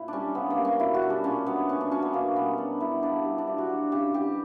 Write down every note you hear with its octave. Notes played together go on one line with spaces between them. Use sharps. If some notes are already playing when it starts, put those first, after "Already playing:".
Already playing: A#2 E4
G3 C#4 D4
C#3 B3
A#3
G3
C#4
B2 E4
F#4
G3
D4
A#2 C#4
F#3 B3
A#2 C#4
D4
F#3 C#4
B3
B2 A#3
G3 B3
B2 D4
G3 E4
C#3 D4
E3 G3
D4
A#2 E4
F#4
F#3
C#3 G4
E3 G3 G4